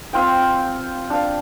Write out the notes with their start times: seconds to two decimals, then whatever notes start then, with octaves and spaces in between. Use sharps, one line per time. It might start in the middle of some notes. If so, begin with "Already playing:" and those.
0.13 C4 F4 G5
1.10 D4 F5